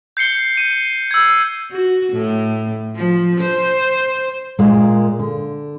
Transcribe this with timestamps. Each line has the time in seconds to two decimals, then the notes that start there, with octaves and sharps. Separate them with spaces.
0.17 G6 C7 C#7 G7
0.57 D#7
1.11 E6 G#6
1.71 F#4
2.13 A2
2.96 F3
3.41 C5
4.59 A#2 G#3 A#3
5.19 D3